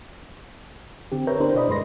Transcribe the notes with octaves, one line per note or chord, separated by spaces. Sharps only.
D3 C4 G4
A#4 B4 C#5 E5 A#5 G6
B3 D4 E4 G4 A#4 C5
B2 D5 D#5 B5
G2 G#3 B4 C6 A#6